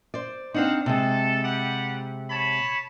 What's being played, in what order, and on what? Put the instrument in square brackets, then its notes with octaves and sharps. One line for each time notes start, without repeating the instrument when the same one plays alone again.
[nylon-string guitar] C5 D5
[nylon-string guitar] C4 D4 D#4 [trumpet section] C5 F5 F#5
[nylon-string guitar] C3 G#3 [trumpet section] A4
[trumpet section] G3 G4 F#5
C#5 A5 B5